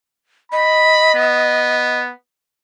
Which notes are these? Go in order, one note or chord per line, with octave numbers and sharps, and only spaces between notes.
D#5 B5
B3